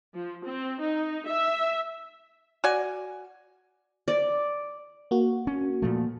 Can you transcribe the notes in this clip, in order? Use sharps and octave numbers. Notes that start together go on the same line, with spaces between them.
F3
C4
D#4
E5
F#4 D5 G#5
D5
A#3 F#4
C#4
A#2 F3 A3